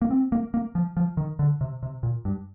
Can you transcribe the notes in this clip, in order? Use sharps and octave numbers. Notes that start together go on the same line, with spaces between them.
A#3
C4
A#3
A#3
F3
F3
D#3
D3
C3
C3
A#2
G2